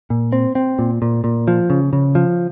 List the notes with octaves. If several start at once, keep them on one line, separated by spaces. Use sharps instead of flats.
A#2
C4
C4
A#2
A#2
A#2
F3
C#3
C#3
F3